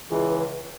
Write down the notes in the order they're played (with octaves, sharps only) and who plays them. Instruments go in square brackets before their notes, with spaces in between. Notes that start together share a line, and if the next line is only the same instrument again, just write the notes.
[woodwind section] C#2 [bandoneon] E3